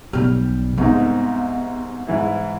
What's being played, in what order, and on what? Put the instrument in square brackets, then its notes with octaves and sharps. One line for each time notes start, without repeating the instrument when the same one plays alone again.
[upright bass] B1 B2 [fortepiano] G3 F6
[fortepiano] C2 G#2 D#4 [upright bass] B3
[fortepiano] G#2 E3 E4